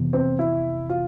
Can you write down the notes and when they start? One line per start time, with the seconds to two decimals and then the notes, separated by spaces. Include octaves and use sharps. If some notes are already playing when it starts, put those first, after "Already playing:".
Already playing: F2 C3 E3 B3
0.13 C4
0.39 E4
0.89 F4